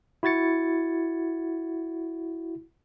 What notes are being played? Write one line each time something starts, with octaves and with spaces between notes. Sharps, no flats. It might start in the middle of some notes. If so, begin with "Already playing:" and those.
E4 F#4 G#6 A6 C#7